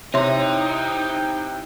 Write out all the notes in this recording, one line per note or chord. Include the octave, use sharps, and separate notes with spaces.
C3 D#4 E4 C#5 E5 G5 C6